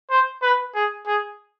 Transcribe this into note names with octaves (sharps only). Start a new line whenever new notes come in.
C5
B4
G#4
G#4